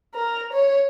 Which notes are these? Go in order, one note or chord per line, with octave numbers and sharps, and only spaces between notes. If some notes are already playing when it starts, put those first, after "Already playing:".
A#4
C#5